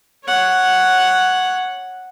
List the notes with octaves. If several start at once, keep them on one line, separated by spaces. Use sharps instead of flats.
C#5 F#5